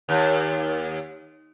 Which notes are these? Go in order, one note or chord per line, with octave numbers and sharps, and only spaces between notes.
D#2